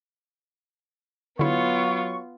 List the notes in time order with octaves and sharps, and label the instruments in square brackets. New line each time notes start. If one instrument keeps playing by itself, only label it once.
[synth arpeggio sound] D3 E4 [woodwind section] F#3 C#6 [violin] B3 F4